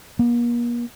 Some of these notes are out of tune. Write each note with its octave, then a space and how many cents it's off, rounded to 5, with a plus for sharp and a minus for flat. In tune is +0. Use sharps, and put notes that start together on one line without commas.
A#3 +40